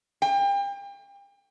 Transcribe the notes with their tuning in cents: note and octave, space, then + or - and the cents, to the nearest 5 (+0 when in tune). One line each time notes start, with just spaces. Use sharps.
G5 +35